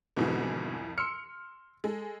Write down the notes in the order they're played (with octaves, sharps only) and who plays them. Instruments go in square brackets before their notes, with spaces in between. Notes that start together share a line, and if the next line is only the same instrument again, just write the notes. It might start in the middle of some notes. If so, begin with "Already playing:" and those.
[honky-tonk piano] C2 F2 E3 [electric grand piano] G#2 B2 D3
[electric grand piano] C6 E6 F6 [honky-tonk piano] C#7
[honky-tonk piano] G#3 [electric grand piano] A4